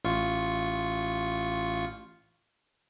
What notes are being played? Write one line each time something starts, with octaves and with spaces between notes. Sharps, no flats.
A1 F4 C#6